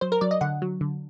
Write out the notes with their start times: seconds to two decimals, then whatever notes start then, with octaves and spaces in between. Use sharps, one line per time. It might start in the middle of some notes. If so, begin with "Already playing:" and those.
0.01 F#3 C5
0.12 A#4
0.21 F#3 D5
0.31 D#5
0.41 D3 F#5
0.62 F#3
0.81 D3